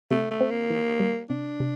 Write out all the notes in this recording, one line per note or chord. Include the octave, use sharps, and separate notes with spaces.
C3 A3
A3
C4
A#3
E3
G3
C3 D4
C3